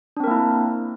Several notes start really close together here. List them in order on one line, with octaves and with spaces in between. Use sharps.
D4 C4 A#4 A#3 E4